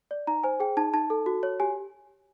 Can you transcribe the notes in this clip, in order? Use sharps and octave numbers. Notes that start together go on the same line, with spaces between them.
D5
D#4 A#5
C5 G#5
G#4 G5
D#4 A5
D#4 A5
A4
F#4
C#5
G4 G#5